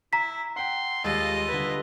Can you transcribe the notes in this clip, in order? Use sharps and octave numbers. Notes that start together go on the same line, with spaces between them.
E4 A#5 B6
F#5 G5 C6
D#2 G3 G#3 F4 A4 D#5
D3 G3 E4 B4